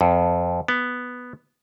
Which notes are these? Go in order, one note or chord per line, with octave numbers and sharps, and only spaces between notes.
F2
B3